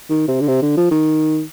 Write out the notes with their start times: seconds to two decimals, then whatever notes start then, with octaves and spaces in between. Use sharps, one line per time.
0.10 D#3
0.28 C3
0.41 D3
0.48 C3
0.62 D3
0.77 F3
0.91 D#3